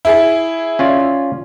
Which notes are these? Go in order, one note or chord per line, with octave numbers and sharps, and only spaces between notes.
E4 G#4
C#4 F4 D5